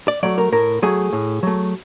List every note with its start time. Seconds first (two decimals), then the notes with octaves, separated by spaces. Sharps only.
0.08 D5
0.23 F#3 A3 D5
0.38 A#4
0.52 A2 A#4
0.82 F#3 A3 G#4
1.13 A2
1.43 F#3 A3